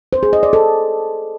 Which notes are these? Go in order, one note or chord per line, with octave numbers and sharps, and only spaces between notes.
C5
G#4
D#5
D5
A4